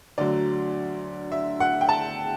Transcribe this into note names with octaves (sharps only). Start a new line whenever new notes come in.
D2 D3 F#3 D5
E5
F#5
G5
A5